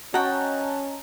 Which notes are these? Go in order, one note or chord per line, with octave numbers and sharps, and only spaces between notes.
C#4 F#4 D#5 F#5 G5 A5 A#5